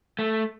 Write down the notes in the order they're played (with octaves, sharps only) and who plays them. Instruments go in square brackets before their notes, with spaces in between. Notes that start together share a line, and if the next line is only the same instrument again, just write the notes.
[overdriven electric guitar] A3